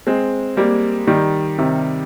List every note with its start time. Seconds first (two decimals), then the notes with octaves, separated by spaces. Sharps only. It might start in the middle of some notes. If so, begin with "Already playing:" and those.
0.07 G#3 C4
0.57 G3 A#3
1.07 D#3 G3
1.58 C3 D#3